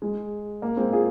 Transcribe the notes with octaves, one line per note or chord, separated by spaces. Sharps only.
G#3
A#3
G#3 C4
F4 G#4